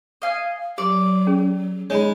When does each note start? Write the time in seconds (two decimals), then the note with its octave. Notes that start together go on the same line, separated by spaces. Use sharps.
0.22 D#5 F5 G#5
0.78 F#3 G4 D5
1.27 C#4 G#4
1.90 G#3 D#4 C#5 B5